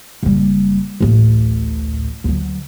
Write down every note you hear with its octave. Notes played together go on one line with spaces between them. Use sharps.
F#1 G3
D1 A1
D2 F#3